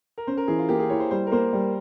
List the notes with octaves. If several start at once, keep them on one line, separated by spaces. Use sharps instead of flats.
A#4
C#4 C5
A#4
E3 G#4
F4
A#3 G4
G#4
E4 C#5
C5
G3 C5
A#4
A#3 C5
G3